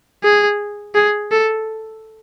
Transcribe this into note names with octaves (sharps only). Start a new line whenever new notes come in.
G#4
G#4
A4